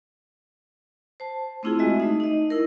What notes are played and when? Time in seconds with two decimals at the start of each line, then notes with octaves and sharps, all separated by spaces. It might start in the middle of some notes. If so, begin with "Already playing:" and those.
1.20 C5 A5
1.63 A3 C4 D4 E4 F4 G#4
1.79 G#3 F#4 D#5 E5
2.00 A3 D#4
2.20 D#4 D#5
2.50 E4 A#4